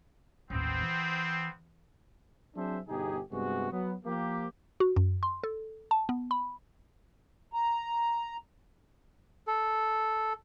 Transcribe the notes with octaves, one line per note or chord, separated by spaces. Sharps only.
A1 D#2 B3 C4
E3
F#3 C4 D4 G#4 C5 E5
G1 B2 D#4 G4 G#4
G2 C3 G#3 B3 F#4
F#3 B3
F3 A#3 G4
F#4
F#2
C6
A4
A5
B3
B5
A#5
A4